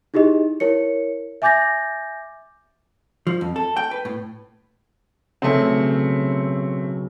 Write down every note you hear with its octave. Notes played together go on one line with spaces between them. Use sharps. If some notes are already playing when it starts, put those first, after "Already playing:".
D#4 E4 G4 G#4 D#5
E4 A#4 C#5 C#7
E5 G#5 D6 G6 A6 A#6
F3
F2
A4
G5
B4
A2
B1 C#3 A3 C4